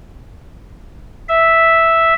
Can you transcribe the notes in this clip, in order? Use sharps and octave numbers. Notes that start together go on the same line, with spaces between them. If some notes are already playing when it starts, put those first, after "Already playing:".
E5